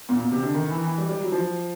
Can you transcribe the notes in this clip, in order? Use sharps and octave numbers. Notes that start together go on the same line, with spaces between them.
A#2
B2
C3
D3
D#3
E3
E3
G3
G3
F#3
F3